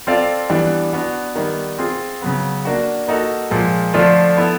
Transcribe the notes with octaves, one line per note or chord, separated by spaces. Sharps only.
C4 F4 A4 D5 F5
E3 G3 B3 D4
B3 D4 F#4
D#3 G3 B3
C4 F4 G#4
C#3 F#3 B3
A#3 D4 F#4
A#3 D#4 F#4 A4
A#2 F3 G#3
D3 F3 A3 D4 F4
B3 E4 A4